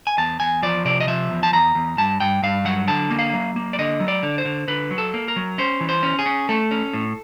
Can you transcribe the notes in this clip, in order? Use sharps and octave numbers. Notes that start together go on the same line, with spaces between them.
G#5
E2 A5
E2 G#5
F3 D5
C3 D5
D#5
F3 E5
E2
A5
E2 A#5
E2
G2 A5
G2 G5
G2 F5
F#3 F#5
D3 A5
A#3
F5
F#3
A#3
D5
D3 D#5
F#3
D5
D3
C5
D3
D3 B4
F#3
A4
A#3
A#4
F#3
C#4 C5
E3
C5
C#4
G#4
C#4
A3 A4
C#4
A2